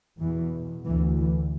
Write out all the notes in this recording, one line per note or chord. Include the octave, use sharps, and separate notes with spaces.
E2 B2 E3
D2 E3
E3